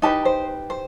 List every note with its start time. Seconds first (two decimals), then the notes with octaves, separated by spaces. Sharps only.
0.02 D#4 G4 B4 A5
0.25 C5
0.70 C5